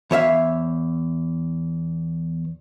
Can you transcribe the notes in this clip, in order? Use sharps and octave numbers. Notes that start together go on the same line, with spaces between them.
E2 C#5 E5 F5